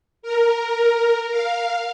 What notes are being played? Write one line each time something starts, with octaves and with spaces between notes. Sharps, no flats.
A#4
F5